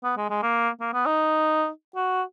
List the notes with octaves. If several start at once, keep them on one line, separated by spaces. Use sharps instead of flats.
B3
G#3
G#3
A#3
A#3
B3
D#4
F#4